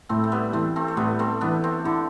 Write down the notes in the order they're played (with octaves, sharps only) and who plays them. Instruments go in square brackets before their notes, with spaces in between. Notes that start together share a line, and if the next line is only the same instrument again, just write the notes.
[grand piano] A2 [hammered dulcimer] A3 C4
[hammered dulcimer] A3
G3 B3
[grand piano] E3 [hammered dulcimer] A3 C4
[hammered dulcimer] A3 C4
A3
[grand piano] A2 [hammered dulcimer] G3 B3
[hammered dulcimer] A3 C4
[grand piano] E3 [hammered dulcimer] B3 D4
[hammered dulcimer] A3 C4
[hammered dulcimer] D3 [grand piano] E4